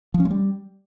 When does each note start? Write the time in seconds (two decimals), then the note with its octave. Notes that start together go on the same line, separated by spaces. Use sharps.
0.14 F3
0.20 C#4
0.25 G#3
0.31 G3